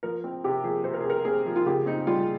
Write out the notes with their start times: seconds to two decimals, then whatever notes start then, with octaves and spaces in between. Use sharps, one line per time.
0.03 F3 A#4
0.24 C4
0.44 C3 G4
0.64 F3 G#4
0.84 C3 C5
0.94 A#4
1.01 G#4
1.06 C3 A#4
1.25 C4 G#4
1.46 F3
1.56 F4
1.66 C#3 G4
1.86 C4 D#4
2.07 G3 F4